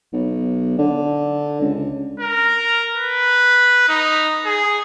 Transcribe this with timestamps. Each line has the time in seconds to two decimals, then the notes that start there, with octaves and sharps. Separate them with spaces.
0.13 B1
0.78 D3
1.61 C#2
2.20 A#4
2.95 B4
3.88 D#4
4.45 G#4